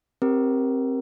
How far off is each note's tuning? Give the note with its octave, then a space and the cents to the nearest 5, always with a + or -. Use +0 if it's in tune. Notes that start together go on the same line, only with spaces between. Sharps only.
C4 +15 G4 +0 A#4 +20